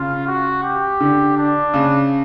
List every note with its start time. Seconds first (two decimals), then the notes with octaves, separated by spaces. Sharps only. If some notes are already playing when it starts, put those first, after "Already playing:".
Already playing: C#3 F4
0.27 F#4
0.63 G4
1.00 D3
1.37 D4
1.74 C#3